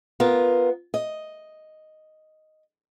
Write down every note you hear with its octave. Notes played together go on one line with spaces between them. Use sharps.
B3 F4 A#4
D#5